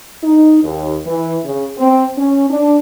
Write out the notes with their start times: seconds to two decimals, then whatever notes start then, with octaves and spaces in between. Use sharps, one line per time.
0.23 D#4
0.63 D#2
1.06 E3
1.44 C#3
1.78 C4
2.17 C#4
2.50 D4